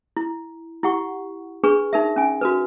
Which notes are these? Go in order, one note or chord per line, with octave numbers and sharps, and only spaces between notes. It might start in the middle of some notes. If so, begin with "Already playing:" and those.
E4
E4 G4 F#5 C#6
D4 G#4 B4 C#6
D#4 A#4 E5
C#4 G#5
F#4 A#4 B4